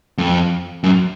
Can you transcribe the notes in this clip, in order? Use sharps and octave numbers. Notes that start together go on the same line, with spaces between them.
F2
F#2